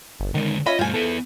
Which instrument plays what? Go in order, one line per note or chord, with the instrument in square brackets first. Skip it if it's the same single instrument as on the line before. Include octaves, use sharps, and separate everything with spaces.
[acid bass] G1
[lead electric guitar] D3 G#3 [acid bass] D#3
[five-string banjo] C#4 E5 B5 [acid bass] F4 [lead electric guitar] D#5
[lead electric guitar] G2 A3 [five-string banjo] F3 G#5
[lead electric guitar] B3 E4 [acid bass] A4